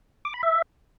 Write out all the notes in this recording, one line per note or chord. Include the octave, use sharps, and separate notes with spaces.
D6
B5
E5